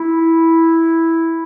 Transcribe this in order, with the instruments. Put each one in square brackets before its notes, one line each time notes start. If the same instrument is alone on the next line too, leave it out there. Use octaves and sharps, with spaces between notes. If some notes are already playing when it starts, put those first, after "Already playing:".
Already playing: [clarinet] E4